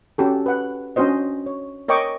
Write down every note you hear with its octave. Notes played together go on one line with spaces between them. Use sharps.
C#4 F#4 G4 A4
B4 F#5
C#4 D4 F#4 C5 D#5
C#5
A#4 C#5 D#5 G5 C#6 D6